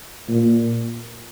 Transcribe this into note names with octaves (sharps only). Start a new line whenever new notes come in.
A#2